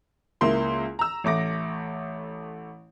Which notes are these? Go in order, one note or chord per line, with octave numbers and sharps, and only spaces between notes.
C#2 A#3 E4 C6
A#5 E6
A1 A3 D6 A#6